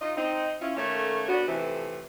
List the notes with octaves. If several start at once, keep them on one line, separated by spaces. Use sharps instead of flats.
D#4 F4 D#5
C4 D#4
C#4 E4 F4
D#3 A3 A#3 C#4 A4 C#5
B3 D4 F#4
F2 A2 C3 E3